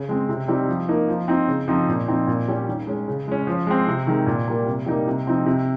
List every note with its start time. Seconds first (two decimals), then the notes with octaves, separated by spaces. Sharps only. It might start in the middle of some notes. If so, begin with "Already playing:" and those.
Already playing: C#3
0.09 G#3 C4
0.29 C3
0.48 G3 C4 D#4
0.68 F3
0.89 A#3 D#4
1.09 F3
1.28 C4 D#4
1.48 C#3
1.68 F3 C4 D#4
1.89 A#2
2.08 F3 C4 D#4
2.27 A#2
2.48 G3 C#4
2.68 D#3
2.87 G#3 C#4
3.08 C#3
3.28 G#3 C#4
3.47 F3
3.67 G#3 C4
3.88 C3
4.07 D#3 G#3
4.26 A#2
4.48 G3 A#3
4.67 C3
4.86 G3 A#3 D#4
5.07 C3
5.27 F3 C4 D#4
5.46 C3